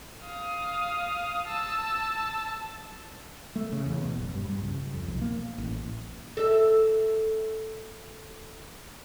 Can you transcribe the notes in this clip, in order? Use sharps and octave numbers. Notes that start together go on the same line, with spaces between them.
F5 D#6
A5 E6
A3
C#3
E2
B2
F#1
G2
G2
C#2
F2
B1
A#3
A1
A4 E5